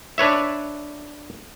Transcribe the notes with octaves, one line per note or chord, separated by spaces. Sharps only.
D4 B4 C#5 E5